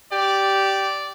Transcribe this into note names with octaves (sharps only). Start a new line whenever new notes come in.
G4 D5